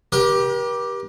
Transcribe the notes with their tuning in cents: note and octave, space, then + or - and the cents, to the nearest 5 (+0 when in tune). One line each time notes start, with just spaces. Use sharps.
G4 +0 A#4 +45